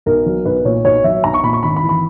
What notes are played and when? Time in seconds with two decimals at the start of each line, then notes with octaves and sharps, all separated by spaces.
0.06 B1 A#4
0.26 F#3
0.45 B1 B4
0.65 A#2 C#5
0.85 B1 C#5
1.04 F#3 E5
1.24 B1 A#5
1.34 C#6
1.43 A#2 B5
1.53 C#6
1.63 G#1 B5
1.76 B5
1.83 E3
1.89 B5